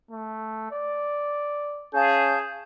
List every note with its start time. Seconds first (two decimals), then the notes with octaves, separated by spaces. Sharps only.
0.11 A3
0.72 D5
1.94 C#4 G#4 F5 A5 G6